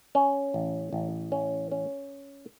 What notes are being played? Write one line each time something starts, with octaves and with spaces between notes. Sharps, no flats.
C#4
A1
A1
C#4
C#4